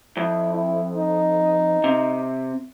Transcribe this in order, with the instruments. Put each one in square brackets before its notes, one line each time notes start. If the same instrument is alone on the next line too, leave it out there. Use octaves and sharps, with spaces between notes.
[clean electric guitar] F2 [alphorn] E4
[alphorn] E4
D#4
[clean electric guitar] C3